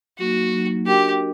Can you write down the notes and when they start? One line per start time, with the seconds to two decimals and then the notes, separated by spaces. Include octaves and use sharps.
0.19 F#3 A#3 D#4 F#4
0.53 F#3 A#3 D#4
0.86 D4 F#4 G4 A#4 D#5